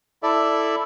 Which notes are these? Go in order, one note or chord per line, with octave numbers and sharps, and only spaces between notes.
E4 A4 D5 E5